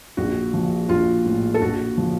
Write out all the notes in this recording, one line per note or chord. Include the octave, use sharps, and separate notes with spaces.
A#1 F#4
F3
A#1 F4
A2
A4
A#1 F#4
F3